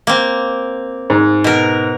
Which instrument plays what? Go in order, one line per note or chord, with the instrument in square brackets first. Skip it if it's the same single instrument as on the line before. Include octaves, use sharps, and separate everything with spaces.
[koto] A#3 C4
[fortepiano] G#2
[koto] B2 A#4